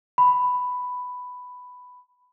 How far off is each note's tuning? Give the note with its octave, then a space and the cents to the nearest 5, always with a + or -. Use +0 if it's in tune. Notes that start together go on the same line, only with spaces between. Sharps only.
B5 +5